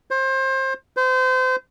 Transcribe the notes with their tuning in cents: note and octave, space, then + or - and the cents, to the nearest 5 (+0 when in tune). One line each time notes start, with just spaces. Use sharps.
C5 +25
C5 -30